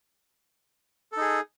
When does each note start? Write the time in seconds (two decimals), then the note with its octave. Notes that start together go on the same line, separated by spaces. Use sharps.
1.12 A4
1.17 D#4
1.21 G#4